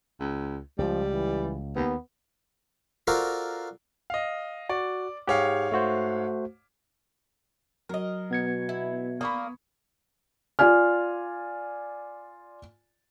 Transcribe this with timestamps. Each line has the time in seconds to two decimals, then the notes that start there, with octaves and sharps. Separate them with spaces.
0.20 C#2
0.78 C#2 F3 G3
1.13 E3
1.76 D#2 B3
3.07 F4 F#4 A4 A#4 C5 D5
4.10 D#5 F5
4.69 F#4 D5
5.27 G#2 G4 G#4 C#5 F5
5.72 A3 F#4 C5
7.89 F#3 A#4 D#5
8.31 B2 B3 G#6 C#7
8.69 E4
9.21 A#3 A#4 D5 B5 C#6 D#6
10.59 F4 D5 G#5 F6